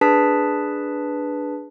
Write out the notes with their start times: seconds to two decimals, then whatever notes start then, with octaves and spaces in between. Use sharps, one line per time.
0.01 D4 G#4 B4 A5 B6